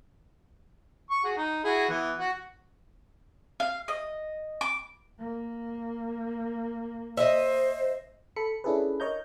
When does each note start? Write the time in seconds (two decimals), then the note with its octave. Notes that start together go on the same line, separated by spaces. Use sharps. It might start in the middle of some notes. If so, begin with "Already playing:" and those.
1.10 C#6
1.24 F#4 G#4
1.37 D#4
1.64 E4 F#4 G#4
1.89 E3 B3
2.19 F#4
3.60 F5
3.88 D#5
4.61 D6
5.19 A#3
7.17 C5 D#5 E5
8.36 A4 B5 C#7
8.64 C#4 D4 E4 G#4 A4 B4
9.00 A#4 C#5 D#5 A#5 G6